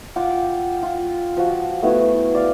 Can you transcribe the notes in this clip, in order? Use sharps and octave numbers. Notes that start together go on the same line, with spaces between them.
F4 F#5 G5 D6
F4
F3 F#4
A3 B3 E4 F#4
D5 F5